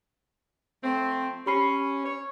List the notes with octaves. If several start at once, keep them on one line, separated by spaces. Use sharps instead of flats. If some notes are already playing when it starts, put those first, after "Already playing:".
F3 A3 C4
C#4 G4 B5 C7
C#5